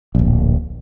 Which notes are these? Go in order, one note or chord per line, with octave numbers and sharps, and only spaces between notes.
D1 A#1